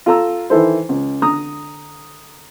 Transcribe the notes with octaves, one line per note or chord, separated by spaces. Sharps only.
F4 A4 A#5 E6
D#3 E3 E4 A4 C5
C#2
D3 A#5 D#6